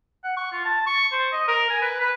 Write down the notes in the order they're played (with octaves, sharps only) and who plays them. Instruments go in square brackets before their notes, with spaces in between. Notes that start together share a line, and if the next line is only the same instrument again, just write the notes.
[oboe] F#5
C#6
F4
A5
C#6
C5
D#5
A#4
G#5
B4
B4